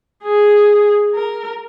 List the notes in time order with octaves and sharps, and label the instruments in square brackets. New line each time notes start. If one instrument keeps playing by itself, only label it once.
[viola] G#4
A#4